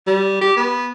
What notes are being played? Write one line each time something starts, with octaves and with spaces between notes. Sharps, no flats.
G3
G4
B3